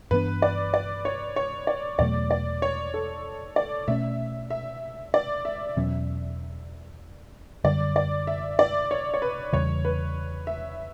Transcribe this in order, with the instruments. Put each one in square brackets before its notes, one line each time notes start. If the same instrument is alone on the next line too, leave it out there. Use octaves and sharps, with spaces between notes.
[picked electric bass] G2 E3 B3 D4 [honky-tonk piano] B4
[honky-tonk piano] D5
D5
C#5
C#5
D5
[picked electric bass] E2 B2 F#3 A3 [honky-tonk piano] D5
[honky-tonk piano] D5
C#5
A4
D5
[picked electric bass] B2 A3 C#4 [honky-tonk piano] E5
[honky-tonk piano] E5
D5
E5
[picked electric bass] E2 B2 F#3 C#4
[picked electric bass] F#2 D3 G3 [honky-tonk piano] D5
[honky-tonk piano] D5
E5
D5
C#5
C#5
B4
[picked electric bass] E2 C#3 E3 G3 [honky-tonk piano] C#5
[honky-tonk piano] B4
E5